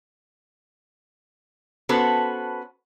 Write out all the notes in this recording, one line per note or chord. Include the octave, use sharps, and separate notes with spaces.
B3 C#4 F#4 A4 B4 C5